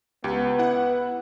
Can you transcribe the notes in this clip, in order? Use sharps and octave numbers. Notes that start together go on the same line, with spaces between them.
C#2 B3 G4
E4 F#5